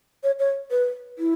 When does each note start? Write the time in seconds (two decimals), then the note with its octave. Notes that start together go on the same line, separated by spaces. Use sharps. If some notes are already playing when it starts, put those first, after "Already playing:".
0.24 C#5
0.39 C#5
0.71 B4
1.18 E4